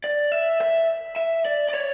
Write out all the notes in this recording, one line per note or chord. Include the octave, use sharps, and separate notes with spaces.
D5
E5
E5
E5
D5
D5
C#5